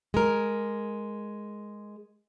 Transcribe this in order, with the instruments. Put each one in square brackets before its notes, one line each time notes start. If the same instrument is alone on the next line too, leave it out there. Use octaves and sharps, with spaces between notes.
[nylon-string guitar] G#3 A#4